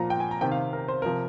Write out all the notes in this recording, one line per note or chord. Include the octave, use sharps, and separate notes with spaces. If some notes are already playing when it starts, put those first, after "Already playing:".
Already playing: A#2 F3 A#5
G5
G#5
A#5
C3 D#3 G5
F5
A#4
C5
C3 F3 A#4